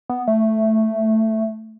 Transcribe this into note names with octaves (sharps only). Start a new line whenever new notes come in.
B3
A3